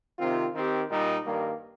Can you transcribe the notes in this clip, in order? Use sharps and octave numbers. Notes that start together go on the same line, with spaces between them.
C3 D#3 C4 F4
D#3 C4 G4
A#2 G3 D#4
G2 D#3 G3 A#3